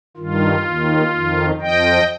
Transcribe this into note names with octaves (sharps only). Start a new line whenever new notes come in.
G2 D#3 F4
D#2 D#3
F2 D#3
F2 F3 D#5 G5